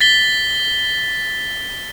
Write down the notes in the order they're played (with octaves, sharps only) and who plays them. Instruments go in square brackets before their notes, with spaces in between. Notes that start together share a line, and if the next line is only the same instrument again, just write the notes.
[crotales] A6 B6 G7